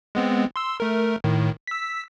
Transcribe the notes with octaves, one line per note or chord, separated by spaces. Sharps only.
G#3 B3 C4
C6 E6
A3 A#4
A2 D#3
E6 B6